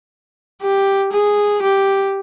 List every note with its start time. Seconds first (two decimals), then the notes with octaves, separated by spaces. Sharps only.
0.62 G4
1.13 G#4
1.62 G4